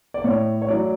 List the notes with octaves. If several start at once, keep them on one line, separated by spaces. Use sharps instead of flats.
D5
A2 C#5
C#5
F#3 A3 D5